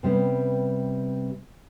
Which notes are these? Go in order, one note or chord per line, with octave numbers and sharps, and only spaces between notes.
C3 G3 B3 C#4